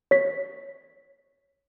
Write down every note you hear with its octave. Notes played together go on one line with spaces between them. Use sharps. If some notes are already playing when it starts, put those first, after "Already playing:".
C#5 B6